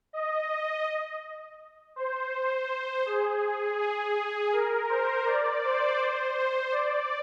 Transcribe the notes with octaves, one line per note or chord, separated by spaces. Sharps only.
D#5
C5
G#4
G#4
G#4
A#4
C5
D5
C5
C5
C5
D5